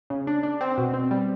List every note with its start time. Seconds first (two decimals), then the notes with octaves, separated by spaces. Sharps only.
0.10 C#3
0.27 D4
0.43 D4
0.61 C4
0.78 B2
0.94 C4
1.11 G3